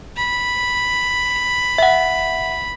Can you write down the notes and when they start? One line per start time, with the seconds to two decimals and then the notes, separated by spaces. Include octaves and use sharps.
0.17 B5
1.78 E5 F#5